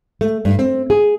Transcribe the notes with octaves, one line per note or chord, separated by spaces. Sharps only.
A3
G2
C4
G#4